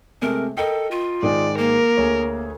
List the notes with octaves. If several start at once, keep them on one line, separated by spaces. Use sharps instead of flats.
C3 G#3 A3 A#4
A4 A#4 D#5 G5
F4
G#2 D#3 G#3 D5
A#3 A#4
D2 G#4 C#5